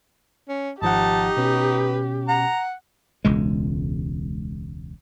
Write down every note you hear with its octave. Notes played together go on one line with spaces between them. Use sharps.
C#4
G#1 F3 D#4 G4 F#5 A5
B2 C#4 B4
F#5 A#5
E1 C#2 G#3